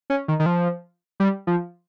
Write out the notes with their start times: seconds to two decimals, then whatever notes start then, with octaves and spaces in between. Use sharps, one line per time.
0.10 C#4
0.28 D#3
0.40 D#3
0.46 F3
1.20 G3
1.47 F3